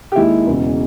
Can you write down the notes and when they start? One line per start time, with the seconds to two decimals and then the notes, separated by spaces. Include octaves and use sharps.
0.12 G4
0.16 D#2 D#3 G#3 E4
0.47 E1 E2 C#3 E3